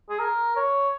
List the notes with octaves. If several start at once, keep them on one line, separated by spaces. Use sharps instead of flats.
G#4
A#4
C#5